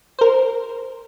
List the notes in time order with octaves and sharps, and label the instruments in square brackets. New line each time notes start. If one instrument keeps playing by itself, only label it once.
[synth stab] A#4 C5